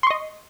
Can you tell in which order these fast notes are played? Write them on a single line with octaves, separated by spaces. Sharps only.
C6 C#6 D#5